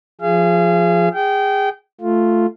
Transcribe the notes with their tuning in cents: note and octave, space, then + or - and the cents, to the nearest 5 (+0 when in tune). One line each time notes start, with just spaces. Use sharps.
F3 +0 G#4 +0 F5 -35
G#4 -20 G5 -25
A3 +0 F4 +0